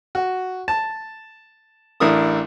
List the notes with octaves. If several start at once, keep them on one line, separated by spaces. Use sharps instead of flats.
F#4
A5
A1 D4 E4 A#4 D#6